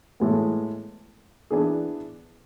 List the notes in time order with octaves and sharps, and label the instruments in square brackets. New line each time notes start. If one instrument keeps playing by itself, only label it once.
[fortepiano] A2 E3 G#3 B3
E3 B3 D4 G#4